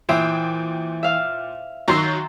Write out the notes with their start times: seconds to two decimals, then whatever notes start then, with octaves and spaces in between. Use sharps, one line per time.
0.09 A#2 E3 C5 E5 G5 D#6
1.03 E5 F5 F6
1.88 D#3 F#3 A#5 C6 C#6 E6